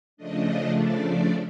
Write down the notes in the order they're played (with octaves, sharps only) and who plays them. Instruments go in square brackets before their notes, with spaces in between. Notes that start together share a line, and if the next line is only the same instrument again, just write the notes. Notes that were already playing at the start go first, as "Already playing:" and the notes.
[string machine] C#3 F3 A3 D4 D#5
D5
D5